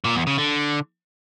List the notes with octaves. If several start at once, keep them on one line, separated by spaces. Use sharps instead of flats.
A#2
E2
C#3
D3